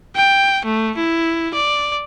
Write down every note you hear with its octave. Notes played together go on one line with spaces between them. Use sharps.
G5
A3
E4
D5